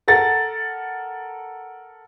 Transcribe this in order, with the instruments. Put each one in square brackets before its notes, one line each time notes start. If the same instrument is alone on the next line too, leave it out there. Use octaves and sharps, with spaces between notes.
[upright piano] A4 A#4 F#5 A6